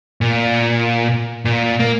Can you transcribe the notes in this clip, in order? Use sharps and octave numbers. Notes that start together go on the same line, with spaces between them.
A#2
A#2
A#3